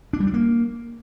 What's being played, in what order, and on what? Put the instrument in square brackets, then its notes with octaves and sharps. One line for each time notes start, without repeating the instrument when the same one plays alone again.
[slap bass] D4
G3
D4
A#3